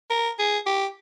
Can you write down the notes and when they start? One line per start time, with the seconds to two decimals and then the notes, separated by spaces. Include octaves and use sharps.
0.10 A#4
0.39 G#4
0.66 G4